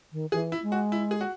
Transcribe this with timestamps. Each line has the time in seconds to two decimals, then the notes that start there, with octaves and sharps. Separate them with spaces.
0.12 D#3
0.32 E3 G#4
0.52 E4
0.62 G#3
0.72 F#4
0.92 E4
1.11 G#4
1.21 F#4